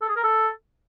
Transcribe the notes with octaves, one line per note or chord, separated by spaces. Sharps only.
A4
G#4
A#4
A4